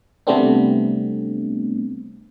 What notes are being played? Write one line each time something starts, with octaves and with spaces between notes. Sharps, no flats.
C3 G3 A3 B3 C4 D4